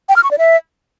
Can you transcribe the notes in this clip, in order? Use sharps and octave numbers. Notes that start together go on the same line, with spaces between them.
G5
F6
C#6
D5
E5